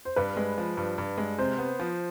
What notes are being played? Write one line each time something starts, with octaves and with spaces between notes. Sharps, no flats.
C5
G2 B4
G#3
F3
G2
G2
G#3
C3 C5
B3
F3